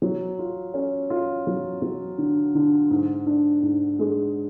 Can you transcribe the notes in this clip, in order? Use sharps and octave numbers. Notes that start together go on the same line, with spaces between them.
F#3
F4
C#4
F4
F#3
F#3
D3
D3
G#2
D4
G#2
G#3